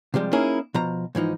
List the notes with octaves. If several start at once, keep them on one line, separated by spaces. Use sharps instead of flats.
C3 F3 G3 G#3
A#3 C#4 D#4 E4 G#4 A#4
B2 F3 A#5
G#2 E3 F3 D#4